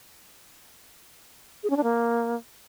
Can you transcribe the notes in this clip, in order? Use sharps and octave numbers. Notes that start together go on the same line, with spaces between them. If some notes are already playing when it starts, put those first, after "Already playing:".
G#4
C#4
D4
A#3